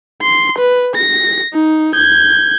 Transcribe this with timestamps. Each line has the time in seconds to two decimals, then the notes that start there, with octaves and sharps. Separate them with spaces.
0.22 C6
0.59 B4
0.96 A#6
1.53 D#4
1.94 G6 G#6